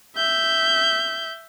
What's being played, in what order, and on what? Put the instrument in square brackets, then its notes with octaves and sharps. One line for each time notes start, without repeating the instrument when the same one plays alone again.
[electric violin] E5 G6